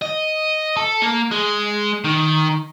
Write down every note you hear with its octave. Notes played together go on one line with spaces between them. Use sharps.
D#5
A4
A#3
G#3
D#3